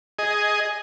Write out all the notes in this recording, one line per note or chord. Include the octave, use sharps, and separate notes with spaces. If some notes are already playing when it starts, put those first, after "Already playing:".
G#4 D#5